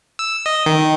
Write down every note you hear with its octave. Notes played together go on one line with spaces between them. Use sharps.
E6
D#5
D#3